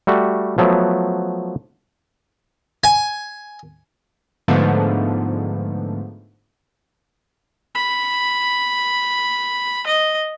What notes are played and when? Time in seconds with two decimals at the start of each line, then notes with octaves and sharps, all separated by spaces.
0.07 G3 A3 F#4
0.58 F3 F#3 A3 B3
2.84 G#5
4.48 G#2 D3 F3 A3 B3
7.75 B5
9.87 D#5